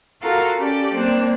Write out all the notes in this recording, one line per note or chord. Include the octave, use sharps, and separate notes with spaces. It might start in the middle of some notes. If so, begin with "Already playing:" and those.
F4 F#4 A4 A#4 F5 A#5
C#4 G4 A4 D5
G3 A#3 C4 D4